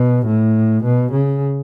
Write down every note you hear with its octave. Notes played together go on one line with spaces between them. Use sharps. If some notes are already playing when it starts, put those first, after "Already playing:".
Already playing: B2
A2
B2
C#3